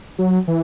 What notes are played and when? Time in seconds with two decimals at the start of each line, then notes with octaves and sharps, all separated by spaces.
0.19 F#3
0.48 E3